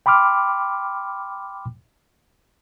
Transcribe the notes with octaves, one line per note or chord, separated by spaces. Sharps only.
G5 B5 C6 D6 F6